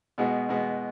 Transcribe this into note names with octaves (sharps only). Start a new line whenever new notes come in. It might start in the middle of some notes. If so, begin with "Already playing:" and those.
B2 G#3 B3
B2 G#3 B3